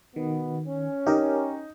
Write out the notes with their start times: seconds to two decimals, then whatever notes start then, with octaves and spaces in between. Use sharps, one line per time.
0.16 B2 D#3 B3
0.68 C#4
1.06 D#4 G4 A#4